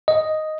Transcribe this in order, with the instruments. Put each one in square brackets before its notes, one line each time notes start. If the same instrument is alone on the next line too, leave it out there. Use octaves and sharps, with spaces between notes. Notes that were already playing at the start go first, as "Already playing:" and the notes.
[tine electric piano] D#5